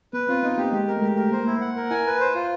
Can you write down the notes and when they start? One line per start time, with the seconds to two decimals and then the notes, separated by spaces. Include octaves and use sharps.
0.13 B3 B4
0.29 C4 F4
0.43 B3 D#4
0.57 A#3 G4
0.73 G#3 G4
0.88 A#4
0.97 A3
1.01 G#3 G4
1.16 A3 A#4
1.31 A#3 C5
1.46 E4
1.61 F#5
1.76 A#4
1.90 E4 G#5
2.06 B4
2.20 C5
2.35 F4